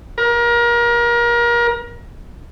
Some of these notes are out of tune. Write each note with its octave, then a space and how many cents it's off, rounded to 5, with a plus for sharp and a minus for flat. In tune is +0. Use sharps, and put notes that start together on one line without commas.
A#4 +30